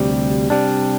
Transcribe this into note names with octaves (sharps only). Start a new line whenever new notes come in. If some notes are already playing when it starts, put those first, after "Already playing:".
Already playing: D2 C3 G3
C3 G3 D4